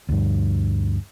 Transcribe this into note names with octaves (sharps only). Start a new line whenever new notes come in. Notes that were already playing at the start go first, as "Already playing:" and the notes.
D2 G2